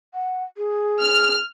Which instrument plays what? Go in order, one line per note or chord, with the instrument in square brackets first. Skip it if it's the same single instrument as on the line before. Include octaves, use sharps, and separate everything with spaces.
[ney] F#5
G#4
[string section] F6